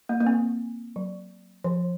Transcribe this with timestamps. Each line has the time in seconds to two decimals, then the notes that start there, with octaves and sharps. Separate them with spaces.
0.09 A#3
0.20 A#3
0.27 C4
0.96 F#3
1.64 F3